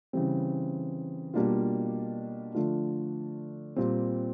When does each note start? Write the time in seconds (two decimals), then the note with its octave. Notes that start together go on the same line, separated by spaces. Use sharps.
0.13 C#3 E3 G3 C4
1.34 B2 G3 A#3 D4 F4
2.54 D3 F3 A3 D4 F4
3.76 A#2 G3 C4